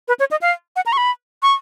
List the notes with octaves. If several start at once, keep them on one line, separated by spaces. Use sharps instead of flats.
B4
C#5
D#5
F5
F#5
A#5
C#6
B5
C#6